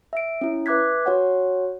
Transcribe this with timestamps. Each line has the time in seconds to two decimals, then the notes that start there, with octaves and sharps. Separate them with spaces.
0.13 E5 D7
0.41 C#4 E4
0.66 B4 E5 D6 F#6 G#6 B6
1.05 F#4 C#5 F#5 G#5